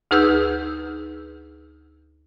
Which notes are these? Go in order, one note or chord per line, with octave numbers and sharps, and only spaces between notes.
D2 D#4 G#4 B4 E6 G6